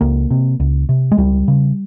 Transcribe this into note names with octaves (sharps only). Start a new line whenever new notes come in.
C#2 A#3
C3
C#2
C3
G#3
C#2 G3
C#3